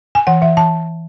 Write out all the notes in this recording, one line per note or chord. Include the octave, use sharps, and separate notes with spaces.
G#5
E3 F#5
E3 E5
E3 A5